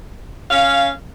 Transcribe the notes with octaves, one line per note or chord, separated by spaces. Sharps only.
C#4 F5